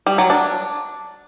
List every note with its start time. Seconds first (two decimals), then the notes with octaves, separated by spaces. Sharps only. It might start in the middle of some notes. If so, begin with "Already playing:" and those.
0.06 G3
0.18 F#3
0.30 D4